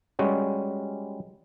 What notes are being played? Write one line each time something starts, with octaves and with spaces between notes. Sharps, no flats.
G3 G#3 C#4 F#4